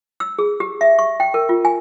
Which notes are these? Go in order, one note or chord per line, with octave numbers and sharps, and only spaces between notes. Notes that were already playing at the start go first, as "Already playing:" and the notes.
E6
G#4
G4
E5
C#6
G5
A#4
F4
G#5